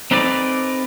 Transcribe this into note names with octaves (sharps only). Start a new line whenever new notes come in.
C4 D#4 A4 B4 D5